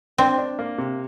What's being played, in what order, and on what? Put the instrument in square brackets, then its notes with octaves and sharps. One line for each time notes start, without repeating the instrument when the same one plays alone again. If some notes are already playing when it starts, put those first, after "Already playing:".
[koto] C4 [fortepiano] D4
[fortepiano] D4
A#3
C3